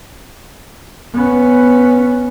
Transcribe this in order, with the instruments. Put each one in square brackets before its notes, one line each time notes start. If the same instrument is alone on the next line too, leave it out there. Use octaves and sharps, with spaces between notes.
[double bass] B3 C#4